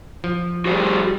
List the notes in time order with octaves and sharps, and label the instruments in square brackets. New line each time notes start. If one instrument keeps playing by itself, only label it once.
[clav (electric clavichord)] F3
[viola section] G3 [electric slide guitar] F#4 G#4 C5